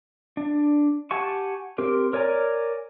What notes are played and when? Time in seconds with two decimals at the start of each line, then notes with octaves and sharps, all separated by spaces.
0.37 D4
1.11 G4 F#5 G#5 A5 C#6
1.78 C4 G4 A#4
2.13 A#4 C#5 D5 G#5 A#5